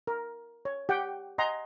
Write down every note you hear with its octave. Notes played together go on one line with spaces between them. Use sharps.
A#4
C#5
G4 F#5 G5
D#5 F#5 G#5 A#5 C6